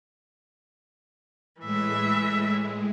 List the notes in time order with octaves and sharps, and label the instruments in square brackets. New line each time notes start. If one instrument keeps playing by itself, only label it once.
[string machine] A2 G#3 [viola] E3 E5